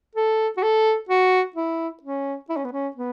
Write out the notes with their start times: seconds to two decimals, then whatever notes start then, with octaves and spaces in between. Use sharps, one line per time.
0.16 A4
0.57 F#4
0.63 A4
1.09 F#4
1.56 E4
2.03 C#4
2.49 E4
2.57 C#4
2.65 B3
2.73 C#4
2.96 B3